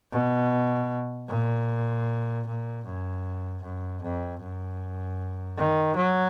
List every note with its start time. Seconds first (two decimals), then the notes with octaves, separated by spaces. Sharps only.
0.12 B2
1.29 A#2
2.47 A#2
2.85 F#2
3.63 F#2
4.02 F2
4.41 F#2
5.57 D#3
5.96 F#3